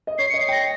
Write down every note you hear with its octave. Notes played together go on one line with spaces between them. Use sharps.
D#5
C#5 C7
D#5 C#7
C7
G5 A#6